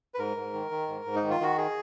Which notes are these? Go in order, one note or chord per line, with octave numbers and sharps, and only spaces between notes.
B4
G#2 A#4
G#2
D#3
D#3
G#2
G#2
D#4
D#3
F4
D#3 F#4
G#4